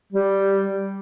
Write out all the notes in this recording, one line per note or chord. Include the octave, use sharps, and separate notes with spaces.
G3